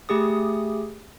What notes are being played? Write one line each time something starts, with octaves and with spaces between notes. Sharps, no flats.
A3 G4 G#4 D#6